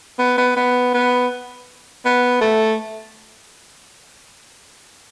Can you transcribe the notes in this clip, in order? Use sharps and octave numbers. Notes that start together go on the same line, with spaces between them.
B3
B3
B3
B3
B3
A3